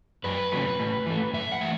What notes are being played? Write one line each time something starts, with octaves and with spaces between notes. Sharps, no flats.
F#2 B4
C#3 F#3 A3
A2
E3 A3
F#2 E5
F#5
E3 A3